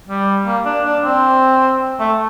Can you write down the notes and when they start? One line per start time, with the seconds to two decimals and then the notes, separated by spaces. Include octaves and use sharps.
0.09 G3
0.46 A#3
0.65 D4
0.85 D4
1.04 C4
2.00 A3